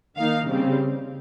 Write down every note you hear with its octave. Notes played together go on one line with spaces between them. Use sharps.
D#3 A#3 D#4 F5
C#3 G3 C4